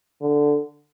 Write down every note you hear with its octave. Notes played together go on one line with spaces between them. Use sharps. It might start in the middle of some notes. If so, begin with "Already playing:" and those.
D3